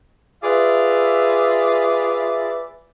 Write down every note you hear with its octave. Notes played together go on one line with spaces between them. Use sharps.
F4 G#4 B4 D5 E5